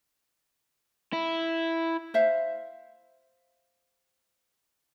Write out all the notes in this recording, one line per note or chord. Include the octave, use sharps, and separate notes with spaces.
E4
C5 E5 F5